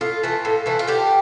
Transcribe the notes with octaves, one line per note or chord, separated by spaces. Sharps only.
A2 F4
E3 A3
A2
E3 A3
F4
D3 G4